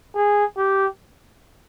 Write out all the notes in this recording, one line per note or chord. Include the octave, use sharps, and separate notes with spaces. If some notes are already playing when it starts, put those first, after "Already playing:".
G#4
G4